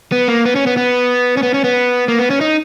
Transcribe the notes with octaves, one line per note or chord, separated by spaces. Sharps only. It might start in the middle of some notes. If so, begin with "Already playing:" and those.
B3
A#3
B3
C#4
B3
B3
C#4
B3
C#4
B3
A#3
B3
C#4
D#4